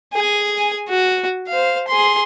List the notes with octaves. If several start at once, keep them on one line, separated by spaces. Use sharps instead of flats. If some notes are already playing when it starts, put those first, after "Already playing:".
G#4 G#5
F#4
C5 F5
G#4 C6